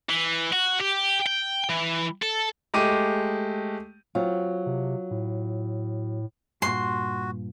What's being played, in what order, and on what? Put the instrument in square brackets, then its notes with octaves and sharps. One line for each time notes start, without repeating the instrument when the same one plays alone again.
[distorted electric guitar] E3
F#4
G4
G5
E3
A4
[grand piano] G#3 A3 G4 D6 D#7
[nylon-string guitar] F#3 C4 F4
[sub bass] C3
A2
[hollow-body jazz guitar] G2 A#2 [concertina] F#4 [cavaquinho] C6